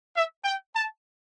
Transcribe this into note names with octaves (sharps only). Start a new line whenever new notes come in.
E5
G5
A5